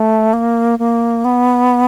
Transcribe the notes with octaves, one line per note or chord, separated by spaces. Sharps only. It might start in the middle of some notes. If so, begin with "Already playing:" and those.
Already playing: A3
A#3
A#3
B3